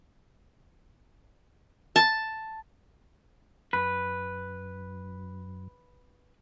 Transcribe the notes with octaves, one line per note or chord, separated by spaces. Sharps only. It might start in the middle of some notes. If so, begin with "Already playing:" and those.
A5
F#2 B4